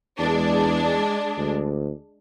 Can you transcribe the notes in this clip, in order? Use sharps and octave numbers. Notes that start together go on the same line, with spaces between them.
E2 G#3 D4
D2